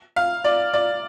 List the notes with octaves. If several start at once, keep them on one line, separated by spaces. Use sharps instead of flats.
F5
D5
D5